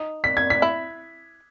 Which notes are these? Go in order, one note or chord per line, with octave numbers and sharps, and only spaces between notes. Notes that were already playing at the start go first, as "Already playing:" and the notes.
Already playing: D#4
B6
G#6
B6
E4